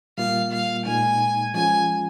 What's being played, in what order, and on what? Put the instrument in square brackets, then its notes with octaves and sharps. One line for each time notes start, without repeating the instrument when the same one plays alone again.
[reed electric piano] A#2 G3 A#3 F4 [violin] F5
[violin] F5
[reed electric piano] A#2 G#3 D#4 [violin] G#5
[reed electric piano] F3 G#3 C#4 F4 [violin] G#5